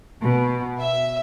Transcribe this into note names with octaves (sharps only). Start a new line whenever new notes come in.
B2
E5